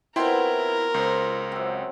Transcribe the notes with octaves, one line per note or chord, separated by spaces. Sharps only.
B2 C4 E4 F4 A#4 G5 C6
C#2 C5
F#2 C4